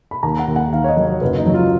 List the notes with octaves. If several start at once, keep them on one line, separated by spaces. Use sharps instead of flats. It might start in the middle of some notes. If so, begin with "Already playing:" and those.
B5
D#2 A#5
F#5
D#2
F#5
D#3 F5
C#5
D#5
F#3
C#5
F#1 B4
D#4
F#3
F4